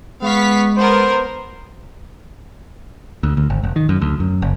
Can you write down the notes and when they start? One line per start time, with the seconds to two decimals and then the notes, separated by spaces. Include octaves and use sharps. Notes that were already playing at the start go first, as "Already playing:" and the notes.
0.22 G#3 B3 F5 C#6 B6
0.78 B3 A#4 C5
3.23 D2
3.37 D2
3.50 G#1
3.64 F1
3.76 D#3
3.89 F#2
4.01 D2
4.20 F#2
4.42 F#1